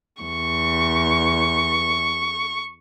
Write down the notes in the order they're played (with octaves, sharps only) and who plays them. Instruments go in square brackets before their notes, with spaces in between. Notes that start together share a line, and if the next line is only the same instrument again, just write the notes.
[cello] E2 [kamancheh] C#6